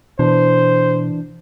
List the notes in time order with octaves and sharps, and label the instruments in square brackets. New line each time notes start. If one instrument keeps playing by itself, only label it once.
[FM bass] B2 [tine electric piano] E3 D4 [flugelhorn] C5